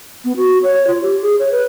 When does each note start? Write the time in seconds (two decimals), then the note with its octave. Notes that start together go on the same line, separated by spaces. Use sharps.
0.25 B3
0.37 F#4
0.63 C#5
0.87 F4
1.02 G4
1.22 G#4
1.39 C#5
1.52 B4